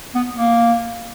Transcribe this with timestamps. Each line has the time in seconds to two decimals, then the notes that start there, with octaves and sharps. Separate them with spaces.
0.15 B3
0.35 A#3